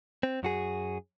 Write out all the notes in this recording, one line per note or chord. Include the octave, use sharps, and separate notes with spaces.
C4
F#2 F#4 G#4